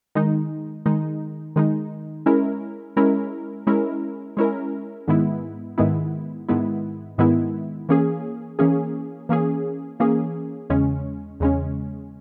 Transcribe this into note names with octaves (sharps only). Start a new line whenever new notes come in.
D#3 G#3 D#4
D#3 G#3 D#4
D#3 G#3 D#4
G#3 C#4 E4 A#4
G#3 C#4 E4 A#4
G#3 C#4 E4 A#4
G#3 C#4 E4 A#4
G#2 D#3 G#3 B3 E4
G#2 D#3 G#3 B3 E4
G#2 D#3 G#3 B3 E4
G#2 D#3 G#3 B3 E4
E3 A#3 C#4 G#4
E3 A#3 C#4 G#4
E3 A#3 C#4 G#4
E3 A#3 C#4 G#4
E2 C#3 G#3 C#4
E2 C#3 G#3 C#4